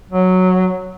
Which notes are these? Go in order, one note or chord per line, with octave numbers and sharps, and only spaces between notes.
F#3